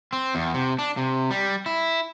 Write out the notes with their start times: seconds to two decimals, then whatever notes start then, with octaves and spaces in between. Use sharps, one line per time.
0.13 C4
0.35 E2
0.54 C3
0.79 D4
0.97 C3
1.31 G3
1.66 E4